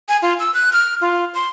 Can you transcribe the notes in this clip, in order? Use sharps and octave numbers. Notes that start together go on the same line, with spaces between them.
G#5
F4
E6
F#6
F6
F4
C6